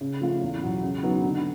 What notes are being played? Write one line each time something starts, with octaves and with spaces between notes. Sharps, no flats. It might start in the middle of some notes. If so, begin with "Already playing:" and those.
C#3
F3 A3 C#4 F4
E2
B2 F#3
C#3
F#3 B3 D#4
D3